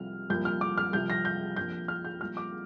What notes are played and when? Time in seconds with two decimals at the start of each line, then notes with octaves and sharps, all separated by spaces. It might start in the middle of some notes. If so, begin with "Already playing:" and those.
Already playing: C2 C3 F3 F6
0.30 C2 A#2 F3 G6
0.45 F6
0.61 D6
0.78 F6
0.93 C2 C3 F3 G6
1.10 A#6
1.25 G6
1.56 A#1 A#2 F3 G6
1.88 F6
2.05 G6
2.21 C2 A#2 F3 F6
2.37 D6